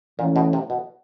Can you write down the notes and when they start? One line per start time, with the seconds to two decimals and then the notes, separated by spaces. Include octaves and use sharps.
0.18 A#2 E3 A3 C#4
0.36 B2
0.53 C3
0.70 B2